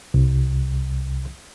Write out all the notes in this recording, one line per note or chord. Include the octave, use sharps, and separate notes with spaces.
C2